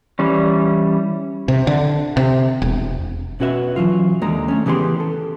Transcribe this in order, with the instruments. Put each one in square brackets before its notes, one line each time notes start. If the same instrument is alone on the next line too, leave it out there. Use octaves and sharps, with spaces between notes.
[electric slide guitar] E3 G3 C#4
[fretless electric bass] C3
D3
C3
E1
[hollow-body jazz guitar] B2 C#4 F#4 B4 E5
E3 F#3 F4
D#2 D3 G#3 A#5
A3 C#4
C#3 E3 B3 G4 G#4 C6
A4